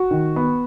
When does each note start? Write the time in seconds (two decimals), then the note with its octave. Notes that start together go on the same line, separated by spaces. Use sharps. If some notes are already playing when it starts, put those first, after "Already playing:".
Already playing: F#4
0.11 D#3
0.36 B3